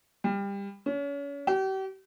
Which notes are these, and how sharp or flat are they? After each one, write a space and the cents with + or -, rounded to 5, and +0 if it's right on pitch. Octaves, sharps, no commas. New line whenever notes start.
G3 +25
C#4 +35
G4 -40